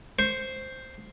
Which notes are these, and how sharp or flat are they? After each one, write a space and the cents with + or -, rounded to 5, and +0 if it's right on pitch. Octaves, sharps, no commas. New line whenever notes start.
C5 +0 C#6 -20